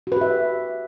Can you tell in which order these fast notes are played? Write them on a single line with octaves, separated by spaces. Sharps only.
F#4 B4 G4 E5